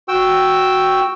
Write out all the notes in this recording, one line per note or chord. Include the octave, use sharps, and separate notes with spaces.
F#4 G5 E6